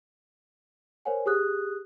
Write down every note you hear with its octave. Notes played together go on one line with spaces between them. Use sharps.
A#4 C5 C#5 F#5 G#5
G4 G#4 D#6 F#6